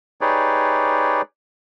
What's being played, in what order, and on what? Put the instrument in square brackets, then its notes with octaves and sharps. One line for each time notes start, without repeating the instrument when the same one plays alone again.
[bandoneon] D#4 G4 G#4 B4 C#5 D5